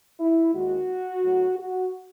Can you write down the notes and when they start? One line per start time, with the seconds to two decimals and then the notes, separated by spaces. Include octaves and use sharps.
0.20 E4
0.54 D#2 D#3 G#3 F#4
1.24 A2 F#3
1.59 F#4